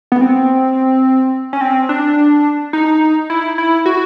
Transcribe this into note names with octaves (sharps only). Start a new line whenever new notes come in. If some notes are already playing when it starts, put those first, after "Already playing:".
B3
C4
C#4
C4
D4
D#4
E4
E4
F#4